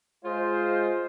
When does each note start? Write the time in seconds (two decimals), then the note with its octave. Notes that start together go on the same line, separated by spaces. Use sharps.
0.25 G#3 F4 C5